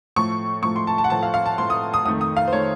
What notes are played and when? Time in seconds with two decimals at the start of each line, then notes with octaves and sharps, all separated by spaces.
0.16 A2 F3 A3 C#6
0.63 A2 F3 A3 C#6
0.76 C6
0.87 A5
0.98 A5
1.04 F#5
1.10 A2 F3 A3 A5
1.23 F5
1.34 F5
1.46 A5
1.58 A2 F3 A3 C6
1.70 D#6
1.94 D#6
2.06 F2 D#3 A3 D#6
2.21 D#6
2.37 F5
2.48 C5
2.52 D#3 A3 C#5